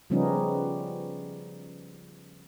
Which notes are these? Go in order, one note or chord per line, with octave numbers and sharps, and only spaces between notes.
C#3 F3 G3 B3 C#4 D#4